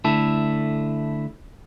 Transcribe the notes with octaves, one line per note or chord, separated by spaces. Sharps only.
D3 A3 E4 A4